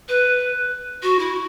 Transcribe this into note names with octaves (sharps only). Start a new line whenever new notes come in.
B4
F#4
E4